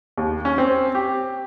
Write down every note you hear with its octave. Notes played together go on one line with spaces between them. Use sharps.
D#2
C#4
C4
G4